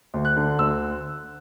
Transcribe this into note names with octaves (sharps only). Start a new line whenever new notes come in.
D2
F#6
D3
D2 E6